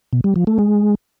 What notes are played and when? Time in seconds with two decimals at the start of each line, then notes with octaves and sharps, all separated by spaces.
0.13 B2
0.24 G3
0.36 F3
0.47 A3
0.59 G#3